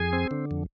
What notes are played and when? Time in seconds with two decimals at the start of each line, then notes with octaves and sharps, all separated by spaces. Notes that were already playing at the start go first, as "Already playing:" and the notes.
Already playing: F2 G#4 G#5
0.13 C4
0.31 D3
0.51 F2